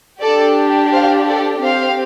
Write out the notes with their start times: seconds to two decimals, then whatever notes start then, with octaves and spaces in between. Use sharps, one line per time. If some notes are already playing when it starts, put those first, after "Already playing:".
0.21 D4 G4 A4 D5
0.93 C5 F5
1.27 A4 D5
1.64 C4 G4 C5 F5